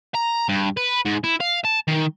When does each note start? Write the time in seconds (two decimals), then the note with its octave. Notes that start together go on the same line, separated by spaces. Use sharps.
0.15 A#5
0.49 G2
0.77 B4
1.05 G#2
1.24 E4
1.41 F5
1.65 A5
1.88 D#3